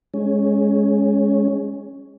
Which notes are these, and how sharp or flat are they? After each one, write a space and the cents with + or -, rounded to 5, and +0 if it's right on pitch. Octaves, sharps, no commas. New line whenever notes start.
G#3 +0 C#4 +0